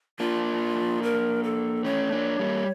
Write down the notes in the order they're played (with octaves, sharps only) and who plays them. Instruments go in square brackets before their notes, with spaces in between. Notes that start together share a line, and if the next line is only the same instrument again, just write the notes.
[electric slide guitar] A#3 D4 [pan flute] F4
[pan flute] A#4
A4
[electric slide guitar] A3 C#4 [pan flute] C#5
[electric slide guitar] A#3 D4
G3 A#3